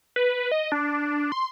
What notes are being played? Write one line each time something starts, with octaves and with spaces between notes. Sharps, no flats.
B4
D#5
D4
C6